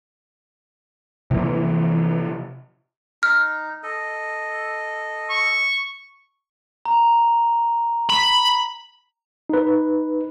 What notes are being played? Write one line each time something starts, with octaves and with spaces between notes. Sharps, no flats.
C3 E3 F3 A#3
D#4 F6
A4 D#5
C#6
A#5
B5
D#4 B4